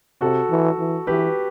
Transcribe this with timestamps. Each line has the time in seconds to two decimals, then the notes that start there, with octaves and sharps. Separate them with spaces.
0.21 C3 F#4 A4
0.50 E3
0.79 E3
1.07 E3 G4 B4